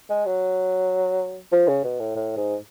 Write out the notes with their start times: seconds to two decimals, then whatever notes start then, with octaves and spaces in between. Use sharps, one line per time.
0.10 G#3
0.26 F#3
1.52 F3
1.68 C#3
1.84 B2
2.00 A2
2.16 A2
2.36 G#2